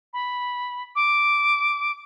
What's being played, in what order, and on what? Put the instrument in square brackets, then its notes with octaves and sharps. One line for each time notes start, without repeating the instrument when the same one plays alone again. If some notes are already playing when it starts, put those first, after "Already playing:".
[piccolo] B5
D6